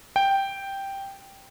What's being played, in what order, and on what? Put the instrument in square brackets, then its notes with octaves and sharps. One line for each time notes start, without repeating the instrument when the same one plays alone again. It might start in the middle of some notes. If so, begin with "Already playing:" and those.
[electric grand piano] G5